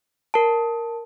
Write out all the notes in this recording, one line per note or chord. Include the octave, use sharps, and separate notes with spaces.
A#4 A5